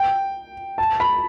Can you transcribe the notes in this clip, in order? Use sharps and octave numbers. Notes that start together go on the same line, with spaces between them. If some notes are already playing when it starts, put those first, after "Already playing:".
Already playing: G5
A5
B5